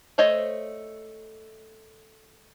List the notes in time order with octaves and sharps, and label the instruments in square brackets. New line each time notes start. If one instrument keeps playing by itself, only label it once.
[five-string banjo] A3 C5 C#5 D#5